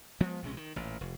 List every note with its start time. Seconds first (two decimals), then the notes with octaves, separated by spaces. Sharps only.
0.21 F3 G#3 B3
0.42 A#1 C3 G#3 C#4
0.57 D#3
0.76 A1 A#2
1.01 F1